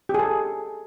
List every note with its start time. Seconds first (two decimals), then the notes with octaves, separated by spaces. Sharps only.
0.09 G4
0.14 G#4
0.19 A4